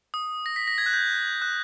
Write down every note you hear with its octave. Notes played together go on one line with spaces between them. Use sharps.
D#6
A#6
B6
A#6
G#6
F#6
G6
F#6